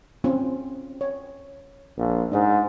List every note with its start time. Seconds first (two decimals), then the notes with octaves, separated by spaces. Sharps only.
0.24 C4 C#4 F4
1.01 C#5
1.97 A#1
2.32 G#2 D4 D#5